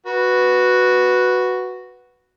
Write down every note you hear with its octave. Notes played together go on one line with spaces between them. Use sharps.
F#4 B4